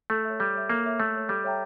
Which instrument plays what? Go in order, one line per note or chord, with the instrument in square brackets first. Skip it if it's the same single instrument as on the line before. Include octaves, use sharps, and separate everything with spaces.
[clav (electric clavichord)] A3 [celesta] A4
[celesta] C#5 E5
[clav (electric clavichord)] G3 [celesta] A4
[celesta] C#5 E5
[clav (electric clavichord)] A#3 [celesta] A4
[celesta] C#5 E5
[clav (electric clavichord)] A3 [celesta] A4
[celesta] C#5 E5
[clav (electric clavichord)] G3 [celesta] A4
[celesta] C#5 E5 G5 A#5